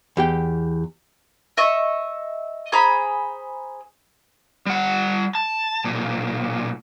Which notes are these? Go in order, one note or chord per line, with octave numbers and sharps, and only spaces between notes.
E2 G4 G5
D#5 E5 C#6
G#4 C5 A#5 B5
G3 F#5
A5
B1 A#2